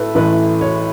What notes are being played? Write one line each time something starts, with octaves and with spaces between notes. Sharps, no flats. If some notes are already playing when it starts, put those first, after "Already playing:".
Already playing: A2 A4 B4
A1 A2 E3 B4
C#5